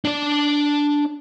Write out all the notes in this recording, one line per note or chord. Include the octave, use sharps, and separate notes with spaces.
D4 D5